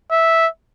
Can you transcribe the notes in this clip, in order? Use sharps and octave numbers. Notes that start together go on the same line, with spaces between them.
E5